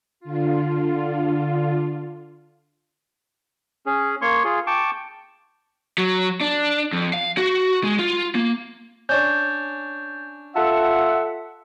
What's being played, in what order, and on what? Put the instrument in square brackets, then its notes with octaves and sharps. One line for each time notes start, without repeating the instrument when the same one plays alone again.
[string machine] D3 F4
[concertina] C#4 G#4
A#3 C#5 C6 C#6
F4 G#4
G5 A5 C#6 D6
[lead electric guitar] F#3
D4
F2
F5
F#4
G#3
F4
A#3
[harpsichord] C#4 D4 C#5 [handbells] G6 A6
[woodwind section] F4 E5 F#5 [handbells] A4 A5